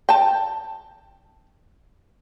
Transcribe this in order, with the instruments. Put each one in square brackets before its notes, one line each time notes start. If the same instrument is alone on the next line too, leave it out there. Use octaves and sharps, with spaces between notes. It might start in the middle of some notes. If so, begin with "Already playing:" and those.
[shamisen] G5 A5